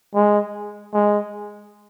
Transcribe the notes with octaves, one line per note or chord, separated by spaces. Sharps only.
G#3
G#3